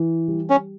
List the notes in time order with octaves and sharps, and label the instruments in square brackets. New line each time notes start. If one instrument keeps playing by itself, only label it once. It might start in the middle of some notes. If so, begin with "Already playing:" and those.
Already playing: [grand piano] E3
G3
[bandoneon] C#4